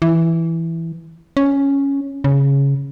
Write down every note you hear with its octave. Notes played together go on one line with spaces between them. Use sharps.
E3
C#4
C#3